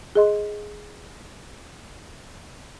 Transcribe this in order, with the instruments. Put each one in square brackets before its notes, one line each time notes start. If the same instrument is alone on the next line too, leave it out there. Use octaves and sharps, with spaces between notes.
[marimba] G#4 D#5 C6